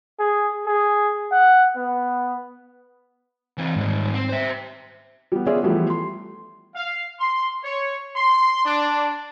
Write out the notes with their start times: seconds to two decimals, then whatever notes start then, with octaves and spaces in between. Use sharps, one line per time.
0.19 G#4
0.66 G#4
1.32 F#5
1.76 B3
3.58 E3 C4
3.76 G#2 D#3 G3
4.13 C4
4.29 C5 E5
5.32 G3 B3
5.46 B3 C#4 F4 G#4 D5 E5
5.63 E3 F3 G3 A3 B3
5.90 C6
6.76 F5
7.19 C6
7.64 C#5
8.16 C6
8.66 D4